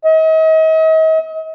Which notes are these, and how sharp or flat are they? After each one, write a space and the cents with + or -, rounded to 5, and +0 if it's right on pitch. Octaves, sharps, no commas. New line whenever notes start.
D#5 +40